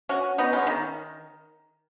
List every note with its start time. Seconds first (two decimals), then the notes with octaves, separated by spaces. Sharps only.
0.09 C#4 F#4
0.38 B3 D#4
0.53 G#3 C#4
0.67 D#3